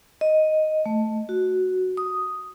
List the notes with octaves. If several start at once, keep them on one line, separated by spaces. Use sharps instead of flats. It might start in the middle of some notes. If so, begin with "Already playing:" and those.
D#5
A3
F#4
D#6